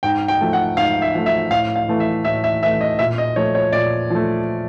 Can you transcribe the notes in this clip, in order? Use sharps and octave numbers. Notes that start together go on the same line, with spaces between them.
G#2 G5
G5
F3 A3
F#5
G#2 F5
E5
F3 A3
E5
A2 F5
F5
E3 A3
E5
A2 E5
E5
E3 A3 E5
D#5
A#2 E5
D#5
F3 A3 C#5
C#5
A#2 D5
F3 A3